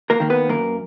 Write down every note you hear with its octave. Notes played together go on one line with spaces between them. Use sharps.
A#3 A#4
D#3 A#3
B3 B4
F#2 A#3 A#4